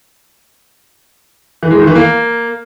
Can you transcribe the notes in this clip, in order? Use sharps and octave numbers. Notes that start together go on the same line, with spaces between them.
E3
G#3
D#3
E3
A#3